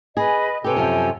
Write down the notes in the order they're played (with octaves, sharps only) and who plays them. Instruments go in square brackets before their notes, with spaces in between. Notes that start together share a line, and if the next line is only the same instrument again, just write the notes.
[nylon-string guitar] G#4 [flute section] B4 D#5 B5
[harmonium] C3 A4 [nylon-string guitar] G4 B4 [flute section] C#5 G5 G#5
[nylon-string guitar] F#2 F3